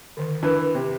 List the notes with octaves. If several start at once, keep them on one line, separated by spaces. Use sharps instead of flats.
D3 D#3
E3 D4 A#4 B4
C3